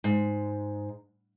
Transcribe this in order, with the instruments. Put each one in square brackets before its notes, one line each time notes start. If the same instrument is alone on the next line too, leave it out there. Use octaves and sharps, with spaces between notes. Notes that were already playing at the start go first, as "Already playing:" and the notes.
[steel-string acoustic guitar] G#2